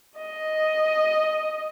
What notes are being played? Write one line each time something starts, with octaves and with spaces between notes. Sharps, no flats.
D#5